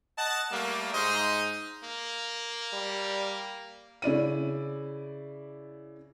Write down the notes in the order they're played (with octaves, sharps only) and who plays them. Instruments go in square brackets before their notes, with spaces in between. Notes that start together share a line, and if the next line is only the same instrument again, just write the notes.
[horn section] D#5 F#5 A5
G3 A3 A#3
G#2 D#4 C5 D#5
[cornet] A#3
[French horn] G3
[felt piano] C#3 E4 D5 D#7